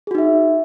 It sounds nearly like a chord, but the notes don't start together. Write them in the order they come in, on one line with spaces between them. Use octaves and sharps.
G#4 F#4 D#4 E5